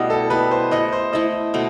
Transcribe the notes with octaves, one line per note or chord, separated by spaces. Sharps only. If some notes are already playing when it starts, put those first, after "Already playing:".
Already playing: B2 G3 A3 B3 E4 D#5
A4
G3 B3 E4 B4
C5
A3 E4 A4 D#5
C5
A3 E4 A4 D#5
B2 A3